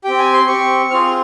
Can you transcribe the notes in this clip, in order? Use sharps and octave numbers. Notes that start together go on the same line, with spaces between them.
C4 G4 G5
G#5
C6
C4 G4 C#6
C4 F4 G#4 F6